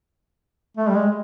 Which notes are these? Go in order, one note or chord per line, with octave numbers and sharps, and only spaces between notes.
A3
G3
G#3